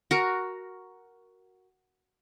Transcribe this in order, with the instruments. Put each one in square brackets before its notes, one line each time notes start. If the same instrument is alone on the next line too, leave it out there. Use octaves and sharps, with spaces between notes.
[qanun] F#4 A#4